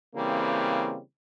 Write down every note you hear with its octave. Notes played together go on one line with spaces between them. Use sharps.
C#3 E3 G3 A#3 C4